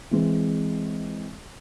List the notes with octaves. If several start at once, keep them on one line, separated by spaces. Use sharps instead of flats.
E3 G#3 C4